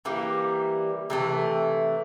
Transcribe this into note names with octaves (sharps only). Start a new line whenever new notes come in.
E3 G3 A#3
C3 E3 A3